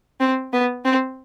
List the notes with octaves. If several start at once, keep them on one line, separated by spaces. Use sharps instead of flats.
C4
B3
C4